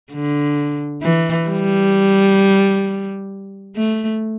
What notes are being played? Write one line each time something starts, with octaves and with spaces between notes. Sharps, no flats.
D3
E3
G3
A3